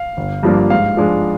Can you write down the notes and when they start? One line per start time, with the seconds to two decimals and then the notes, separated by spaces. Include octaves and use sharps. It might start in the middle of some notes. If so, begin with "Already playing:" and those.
Already playing: F5
0.17 G1
0.43 G2 F3 A#3 D4
0.70 G#2 F5
0.97 F3 G#3 D4